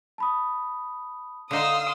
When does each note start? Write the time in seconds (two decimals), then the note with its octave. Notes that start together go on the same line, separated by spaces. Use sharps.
0.18 A5 B5 D#6
1.51 D3 D#4 F5 C6 D#6 E6